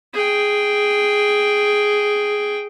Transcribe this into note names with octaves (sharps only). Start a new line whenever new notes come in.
G#4 G5